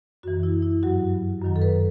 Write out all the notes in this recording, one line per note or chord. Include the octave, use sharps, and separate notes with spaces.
F#2 E3 F#4
E4
E4
G2 F#3 F#4
F#2 D#3 F#3
A4
B4